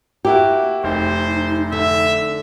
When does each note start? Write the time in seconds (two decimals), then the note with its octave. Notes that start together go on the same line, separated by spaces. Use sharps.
0.25 A#3 E4 F#4 G4
0.84 F1 D#4 C5
1.72 D3 E5